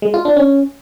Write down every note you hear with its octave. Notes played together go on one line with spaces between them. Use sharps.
G#3
F4
D4
C#4